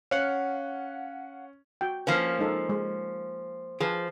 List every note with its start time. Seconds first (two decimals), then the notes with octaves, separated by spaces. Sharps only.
0.11 C#4 F5 F#5
1.81 F#4 G5
2.07 F3 A#3 C#4 B4
2.39 G#3 D#4 A4
2.70 G#3
3.80 F3 G#4 B4 C5